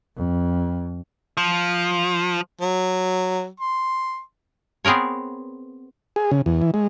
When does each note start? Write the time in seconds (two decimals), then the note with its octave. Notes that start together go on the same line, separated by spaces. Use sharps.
0.17 F2
1.37 F3
2.61 F#3
3.60 C6
4.85 B3 C4 G#4 A#4 C#5
6.16 G#4
6.31 C#3
6.46 E2
6.62 E3
6.74 G#3